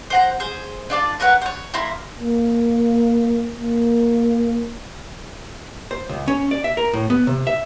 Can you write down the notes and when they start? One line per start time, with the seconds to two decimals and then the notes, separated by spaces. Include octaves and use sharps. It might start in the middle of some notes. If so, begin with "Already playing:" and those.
0.10 C5 F#5 A#5
0.40 G#4 C5
0.90 D4 F4 D5 A5
1.20 A#4 B4 C#5 F#5
1.42 C5 C#5
1.74 A#3 E4 A#5 C6
2.19 A#3
3.54 A#3
5.91 C5
6.09 C#2
6.28 C#4
6.51 D5
6.64 E5
6.77 A#4
6.94 A2
7.10 B3
7.27 C3
7.47 E5